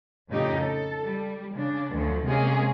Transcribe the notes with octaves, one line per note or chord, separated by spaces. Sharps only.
F2 A2 C#3 D#4 G4
A4
G3
C#3 D4
D2 F3 F#3
C3 G#3 A#3 C#4 G#4